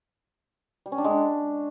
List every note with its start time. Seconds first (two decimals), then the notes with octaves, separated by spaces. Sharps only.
0.86 G3
0.92 C#4
0.98 D4
1.04 G#3
1.11 D4